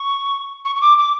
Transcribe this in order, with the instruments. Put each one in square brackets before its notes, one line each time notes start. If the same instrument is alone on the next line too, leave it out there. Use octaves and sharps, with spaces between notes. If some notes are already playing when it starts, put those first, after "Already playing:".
Already playing: [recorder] C#6
C#6
C#6
D6
D6